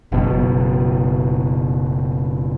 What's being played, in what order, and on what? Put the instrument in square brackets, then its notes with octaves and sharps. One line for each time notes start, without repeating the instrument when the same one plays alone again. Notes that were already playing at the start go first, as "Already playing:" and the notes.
[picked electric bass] F#1 B2